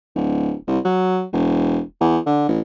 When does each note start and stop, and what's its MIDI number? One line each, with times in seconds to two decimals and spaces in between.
0.16 0.54 26
0.68 0.79 36
0.85 1.25 54
1.33 1.80 28
2.01 2.18 40
2.26 2.47 50
2.49 2.60 33